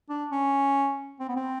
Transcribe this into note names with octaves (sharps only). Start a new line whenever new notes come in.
D4
C#4
C4
B3
C4